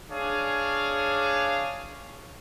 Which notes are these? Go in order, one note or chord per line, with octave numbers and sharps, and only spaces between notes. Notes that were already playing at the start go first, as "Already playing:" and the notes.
D4 G#4 C#5 F5